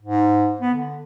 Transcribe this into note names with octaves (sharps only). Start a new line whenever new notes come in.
G#2
B3
D3